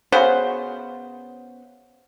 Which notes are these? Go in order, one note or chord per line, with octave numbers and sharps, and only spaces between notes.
C#3 B3 F#4 C5